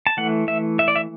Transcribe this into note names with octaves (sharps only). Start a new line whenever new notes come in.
A5
E3 A3 F#5
E5
E5
D5
E5